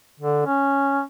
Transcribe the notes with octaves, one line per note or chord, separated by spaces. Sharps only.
D3
C#4